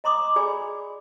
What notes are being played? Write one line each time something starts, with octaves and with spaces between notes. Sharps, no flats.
D#5 A#5 C6 D6 D#6
G#4 D5 G#5 B5